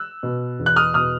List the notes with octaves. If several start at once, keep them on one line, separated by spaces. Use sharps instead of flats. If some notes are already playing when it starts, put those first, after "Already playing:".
Already playing: E6 F#6
B2
E2
F#6
D#6 F6
B2 D#6 F6